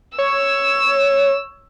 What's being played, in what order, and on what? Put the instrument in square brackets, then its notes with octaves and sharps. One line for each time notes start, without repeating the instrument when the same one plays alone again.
[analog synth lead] C#5 [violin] E6